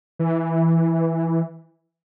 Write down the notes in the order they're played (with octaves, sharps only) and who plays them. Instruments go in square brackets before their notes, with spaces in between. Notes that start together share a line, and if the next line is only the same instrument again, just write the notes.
[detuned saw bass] E3